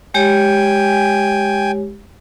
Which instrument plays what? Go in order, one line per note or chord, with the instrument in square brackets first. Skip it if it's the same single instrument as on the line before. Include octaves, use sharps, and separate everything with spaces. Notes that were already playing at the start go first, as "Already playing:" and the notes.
[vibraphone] G#3 G4 C#5 [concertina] G5 G#5